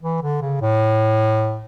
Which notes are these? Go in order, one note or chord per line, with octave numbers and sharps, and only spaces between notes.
E3
D3
C#3
A2